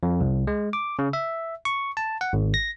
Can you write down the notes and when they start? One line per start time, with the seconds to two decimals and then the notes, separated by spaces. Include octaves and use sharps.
0.03 F2
0.21 C2
0.47 G#3
0.73 D6
0.99 C#3
1.13 E5
1.65 C#6
1.97 A5
2.21 F#5
2.33 G#1
2.54 A#6